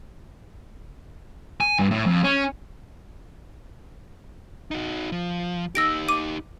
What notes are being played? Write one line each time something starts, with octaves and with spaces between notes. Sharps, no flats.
G#5
G2
A2
F2
C#4
D#4 F#4
F3
D#4 G4 E6 A#6 D7
D6 D#7